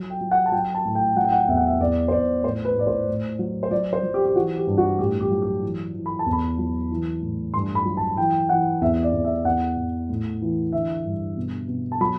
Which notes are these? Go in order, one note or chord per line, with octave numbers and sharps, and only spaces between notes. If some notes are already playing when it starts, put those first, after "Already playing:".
Already playing: F#3
G5
F#3
F#5
A5
F#3 G5
A5
A2
G5
F#3 F#5
G5
F#5
E2 E5
F#5
E5
E2 D5
C5
E2 D5
A2 C5
B4
A2 D5
C5
A2
F#3
C5
F#3 D5
C5
F#3
G4
G4
E3 F#4
G4
G2
F#4
A2 G4
G4
F#3
G4
E3
E3
B5
A5
E2
B5
F#3
E3
A2
G2 C6
B5
F#3
A5
E3 G5
E3 F#5
E2 E5
D5
E2
E5
E2 F#5
E2
A2
E3
D3 E5
G2
B2
B2
A5
F#3 B5